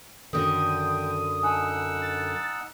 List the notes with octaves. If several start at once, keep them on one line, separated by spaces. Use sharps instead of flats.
F#2 D3 D#3 A4 G5 D#6
D#4 F#5 G#5 A5 E6
A6